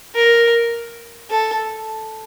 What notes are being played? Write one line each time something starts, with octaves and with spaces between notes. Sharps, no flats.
A#4
A4